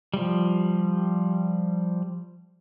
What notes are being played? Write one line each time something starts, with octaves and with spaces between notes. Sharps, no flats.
F3 G3